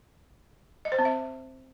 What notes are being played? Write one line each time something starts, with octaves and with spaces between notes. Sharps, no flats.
D#5
C5
C4
E5